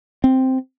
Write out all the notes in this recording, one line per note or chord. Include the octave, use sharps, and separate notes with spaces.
C4